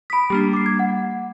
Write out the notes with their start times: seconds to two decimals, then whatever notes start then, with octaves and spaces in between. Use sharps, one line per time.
0.10 B5 D#6 B6 D7
0.30 G3 A#3 D4 G4
0.53 D6 C7
0.66 G#6
0.79 F#5